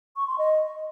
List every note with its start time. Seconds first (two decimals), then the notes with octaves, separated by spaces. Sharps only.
0.16 C#6
0.27 C6
0.38 D#5